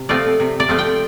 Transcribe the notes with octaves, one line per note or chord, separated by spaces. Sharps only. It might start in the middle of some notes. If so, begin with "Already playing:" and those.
Already playing: C3
F3 A3 C4 F4 D5
C3
D5
F3 A3 C4 F4
G5